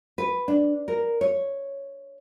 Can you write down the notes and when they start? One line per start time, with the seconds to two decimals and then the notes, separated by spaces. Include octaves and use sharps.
0.18 B4
0.48 D4
0.88 A#4
1.21 C#5